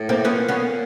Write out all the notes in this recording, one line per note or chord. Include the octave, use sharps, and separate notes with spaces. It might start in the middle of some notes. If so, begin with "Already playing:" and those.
Already playing: A2
A#3 C4
A#2 B3 C#4
B3 C#4